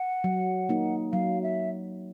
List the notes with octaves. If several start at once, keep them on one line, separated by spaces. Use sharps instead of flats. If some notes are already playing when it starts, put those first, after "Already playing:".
Already playing: F#5
F#3
A#3 D#4
F#3 F5
E5